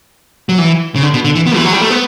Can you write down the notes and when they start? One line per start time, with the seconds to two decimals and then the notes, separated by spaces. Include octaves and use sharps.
0.49 F#3
0.58 E3
0.96 C#3
1.03 D3
1.14 B2
1.24 D3
1.35 E3
1.47 B3
1.56 E3
1.65 F#3
1.73 G3
1.81 A3
1.90 B3